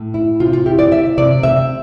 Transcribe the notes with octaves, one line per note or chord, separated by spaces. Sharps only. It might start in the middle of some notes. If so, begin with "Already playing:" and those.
Already playing: A2
E4
C3 F4
F4
E4 G4
D5
C3 E5
C3 D5
C3 E5